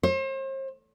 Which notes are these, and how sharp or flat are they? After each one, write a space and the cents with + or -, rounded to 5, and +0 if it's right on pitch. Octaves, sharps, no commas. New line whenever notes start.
C5 +40